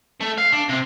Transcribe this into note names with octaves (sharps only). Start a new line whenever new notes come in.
A3
F5
D4
C3